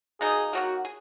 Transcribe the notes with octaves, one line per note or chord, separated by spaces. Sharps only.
B2 A#3 D#4 G#4
D#3 F#3 A#3 F#4
G#4